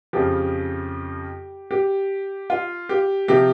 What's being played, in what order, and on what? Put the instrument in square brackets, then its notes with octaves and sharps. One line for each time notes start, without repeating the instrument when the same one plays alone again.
[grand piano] F2 C#3 F3 G4
G4
F4
G4
C3 F3 G4